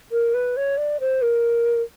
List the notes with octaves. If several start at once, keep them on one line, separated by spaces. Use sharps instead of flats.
A#4
B4
C#5
D5
C5
A#4